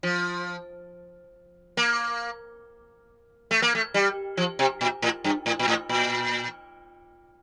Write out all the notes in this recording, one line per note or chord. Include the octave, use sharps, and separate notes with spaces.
F3
A#3
A3
A#3
A3
G3
F3
C3
A#2
A2
G2
A2
A#2
A2
A#2